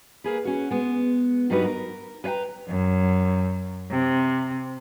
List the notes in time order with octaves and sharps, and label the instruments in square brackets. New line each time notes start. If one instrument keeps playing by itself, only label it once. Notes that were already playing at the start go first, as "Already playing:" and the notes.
[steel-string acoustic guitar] A#3 G#4 B4
C#4 F#4
G#3 B3
G2 F#3 G3 D#4 F#4 B4
A#4
B4 C#5 F5 G5 A#5
[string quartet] F#2
C3